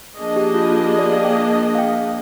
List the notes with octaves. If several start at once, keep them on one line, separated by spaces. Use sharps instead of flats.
F3 A#3 D4 G#4 D#5
G4
F4
F4
G4
D5
F5
G5
F5
G5